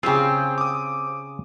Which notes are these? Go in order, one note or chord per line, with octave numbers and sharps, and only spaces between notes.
C#3 C4 C#4 F4 G4 G#4 G5
D6 D#6